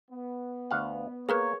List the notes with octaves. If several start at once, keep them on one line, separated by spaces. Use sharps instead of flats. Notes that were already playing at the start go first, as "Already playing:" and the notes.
B3
D2 F5 F#5
A#3 G#4 A#4 B4 C#5